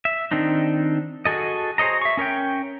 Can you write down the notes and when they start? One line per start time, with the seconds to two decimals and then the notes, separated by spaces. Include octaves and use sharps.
0.05 E5
0.31 D#3 C4 D4 D#4
1.25 F#4 G#4 A4 D#5
1.78 G#4 C5 C#5 D#5 A#5
2.02 E5 C#6
2.17 C#4 A#4 C#5 G5